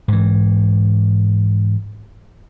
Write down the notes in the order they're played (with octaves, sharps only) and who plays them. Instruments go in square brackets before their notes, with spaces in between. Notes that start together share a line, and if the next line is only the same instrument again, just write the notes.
[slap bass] G#2 E3